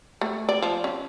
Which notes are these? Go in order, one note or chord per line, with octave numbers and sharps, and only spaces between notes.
A3
D5
F3
C#4